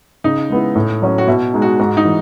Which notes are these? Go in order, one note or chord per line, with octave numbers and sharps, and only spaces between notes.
C#3 D#4
G#3 B3 E4
A2
F#3 C#4 F#4
F#4
B2 E4
G#3 D#4
F#4
G#2 F#4
D#4
E3